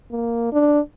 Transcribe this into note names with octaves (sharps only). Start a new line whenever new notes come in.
A#3
D4